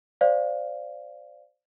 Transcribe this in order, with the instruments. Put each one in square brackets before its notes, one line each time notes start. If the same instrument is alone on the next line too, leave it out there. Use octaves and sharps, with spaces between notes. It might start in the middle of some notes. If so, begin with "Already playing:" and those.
[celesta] C5 D5 F5